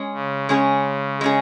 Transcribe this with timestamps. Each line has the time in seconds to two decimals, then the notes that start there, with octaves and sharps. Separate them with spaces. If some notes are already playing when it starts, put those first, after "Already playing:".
Already playing: G#3 C#4 G#4
0.13 C#3
0.49 G#3 C#4 G#4
1.21 G#3 C#4 G#4